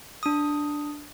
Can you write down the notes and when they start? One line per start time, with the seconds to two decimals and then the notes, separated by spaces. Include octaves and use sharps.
0.23 D4 D#6